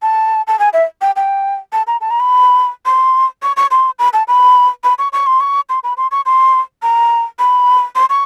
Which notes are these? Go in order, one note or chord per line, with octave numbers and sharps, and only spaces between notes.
A5
A5
G#5
E5
G5
G5
A5
A#5
A5
A#5
B5
C6
C#6
C#6
C6
B5
A5
B5
B5
C#6
C#6
C6
C#6
C6
B5
C6
C#6
C6
A#5
B5
C6
C#6